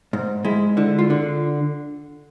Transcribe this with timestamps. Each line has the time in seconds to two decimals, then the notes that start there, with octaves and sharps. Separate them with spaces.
0.13 G#2
0.45 G#3 E4
0.77 D3 E4
0.99 F4
1.10 D3